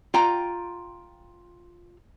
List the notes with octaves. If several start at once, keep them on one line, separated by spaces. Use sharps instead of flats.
F4 G5 A#5